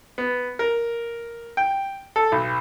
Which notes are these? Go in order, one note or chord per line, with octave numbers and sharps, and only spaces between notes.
B3
A#4
G5
A4
B1